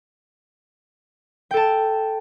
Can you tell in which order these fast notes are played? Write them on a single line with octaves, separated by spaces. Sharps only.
G5 A4 A5